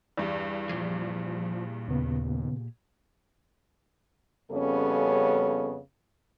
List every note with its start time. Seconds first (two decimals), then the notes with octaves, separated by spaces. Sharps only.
0.17 E2 G2 D5
0.69 A#2 F3 G4 G#4
1.88 D#2 C#3 B3
4.51 F2 C#3 G3 B3 C#4 A4